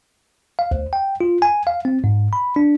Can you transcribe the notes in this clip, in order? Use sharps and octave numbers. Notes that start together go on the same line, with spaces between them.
F5
D2
G5
F4
G#5
F5
C4
G#2
B5
D4